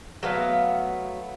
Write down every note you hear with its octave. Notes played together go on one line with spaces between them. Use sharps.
F#3 A3 B3 F5